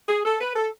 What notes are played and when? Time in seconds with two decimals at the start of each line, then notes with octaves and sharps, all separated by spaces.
0.09 G#4
0.25 A4
0.40 B4
0.56 A4